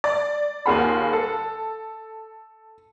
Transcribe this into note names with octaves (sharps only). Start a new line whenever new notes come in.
D5
D#2 A#3 F4 G#4 F#5 B5
A4